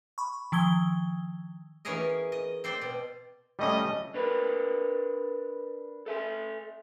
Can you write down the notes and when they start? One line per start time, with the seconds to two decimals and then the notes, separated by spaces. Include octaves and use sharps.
0.18 B5 C#6
0.52 D#3 F3 E6 G#6 G7
1.85 E3 B3 C#4 G#4 A#4 D#5
2.32 D#5
2.64 C4 C5 D5 G5
2.81 B2
3.59 G3 A3 C#4 D#5
4.14 D4 A#4 B4
6.06 A4 E5 G#5